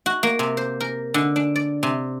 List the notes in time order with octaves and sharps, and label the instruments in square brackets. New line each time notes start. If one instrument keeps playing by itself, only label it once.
[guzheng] F#4
A#3
C3
C5
A#4
D3
D4
D5
C3